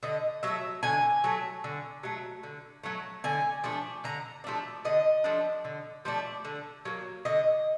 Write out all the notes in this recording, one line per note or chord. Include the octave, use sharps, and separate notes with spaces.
D3 D#5
F#3 A3 E5
D3 G#5
F#3 A3
D3
F#3 A3
D3
F#3 A3
D3 G#5
F3 A3 D4
D3 A#5
F3 A3 D4
D3 D#5
F3 A3 D4
D3
F3 A3 D4
D3
F#3 A#3
D3 D#5